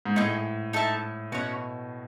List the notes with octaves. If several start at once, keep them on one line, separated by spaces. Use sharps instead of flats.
G#2
A2 D#4 G#4 D#5
D#4 A4 E5 A5
B2 C#4 F#4 C#5 F#5